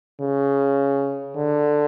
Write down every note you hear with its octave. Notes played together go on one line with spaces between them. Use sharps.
C#3
D3